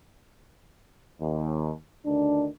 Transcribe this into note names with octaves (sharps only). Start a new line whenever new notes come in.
D#2
D2 D#3 D4